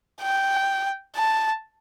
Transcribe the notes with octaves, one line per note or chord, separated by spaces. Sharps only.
G5
A5